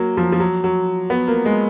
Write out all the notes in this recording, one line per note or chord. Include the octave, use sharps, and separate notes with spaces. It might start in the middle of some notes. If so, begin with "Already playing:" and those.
Already playing: F#3 A#3
F3
F3
F#3
F#3
B3
A#3
G#3